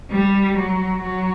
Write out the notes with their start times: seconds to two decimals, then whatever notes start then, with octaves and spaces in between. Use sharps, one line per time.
0.11 G3
0.58 F#3
1.02 F#3